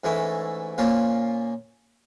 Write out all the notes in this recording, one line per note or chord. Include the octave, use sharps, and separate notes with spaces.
G#2 E3 A3 C#4 E4
A#2 F3 A#3 C#4 F4